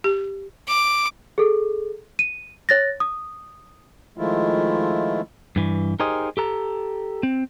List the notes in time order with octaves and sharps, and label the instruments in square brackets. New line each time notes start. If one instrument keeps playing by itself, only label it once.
[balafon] G4
[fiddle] D6
[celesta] G#4 A4
D#7
C#5 A6 A#6
D#6
[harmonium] D#3 F3 G#3 A3 E4 F4
[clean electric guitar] G2 E3
D#4 G4 G#4 A#4 C5 D#5
G4 A4 A#5
C4